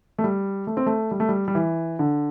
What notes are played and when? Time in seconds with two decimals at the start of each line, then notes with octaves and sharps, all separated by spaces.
0.19 A3
0.24 G3
0.67 A3
0.77 C4
0.86 A3
1.11 G3
1.20 A3
1.29 G3
1.48 G3
1.55 E3
1.99 D3